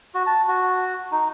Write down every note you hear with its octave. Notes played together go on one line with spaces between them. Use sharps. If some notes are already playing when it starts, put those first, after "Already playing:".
F#4
A5
F#4
D#4